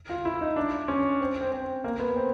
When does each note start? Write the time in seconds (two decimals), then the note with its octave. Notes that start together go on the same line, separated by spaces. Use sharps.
0.09 F4
0.25 E4
0.41 D#4
0.56 D4
0.88 C#4
1.21 C4
1.41 C4
1.52 C4
1.84 A#3
2.00 B3
2.16 C4